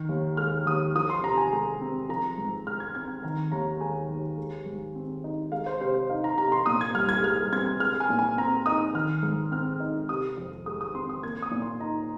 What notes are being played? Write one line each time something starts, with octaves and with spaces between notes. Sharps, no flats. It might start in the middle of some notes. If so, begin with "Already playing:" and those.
Already playing: D#3
D#2
G#3 F6
D#2 D#6
F3 D#6
C6
C3 A#5
G#5
G#3 G#5
C4
F3 A#5
G#2
G#3 F6
G#6
C4 G#6
D#3 A#5
D#2 A#5
G#3 G#5
D#2
G#3
G#2
C4
D#4
G#3 F5
C5
C3 C5
C5
D#4 F5
A#5
C3 A#5
C6
A#2 D#6
G#6
C2 F6
G#6
G#3 F6
C4 G#6
G#3 F6
G#5
A#2
G#5
C4 A#5
D#4 D#6
D#3 F6
G#2
C4 F6
D#4
C3 D#6
F2
G#3 D#6
D#6
C4 C6
D#6
A#3 G#6
D#6
A#2
C6
D#4 A#5